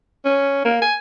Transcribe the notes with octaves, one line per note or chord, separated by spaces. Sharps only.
C#4
A#3
G#5